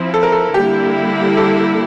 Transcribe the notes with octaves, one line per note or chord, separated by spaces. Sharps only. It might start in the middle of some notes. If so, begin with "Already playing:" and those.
Already playing: F3 C4 E4
A4
A#4
A4
D3 G3 A#3 E4 G4
A4